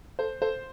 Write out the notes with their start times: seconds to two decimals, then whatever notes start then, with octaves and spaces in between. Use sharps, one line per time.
0.19 A4 C5
0.42 A4 C5